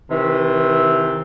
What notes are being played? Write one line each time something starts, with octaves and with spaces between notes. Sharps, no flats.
C3 D#3 E3